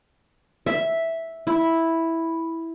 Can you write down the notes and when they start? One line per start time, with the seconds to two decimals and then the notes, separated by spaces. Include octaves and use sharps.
0.66 E5
1.47 E4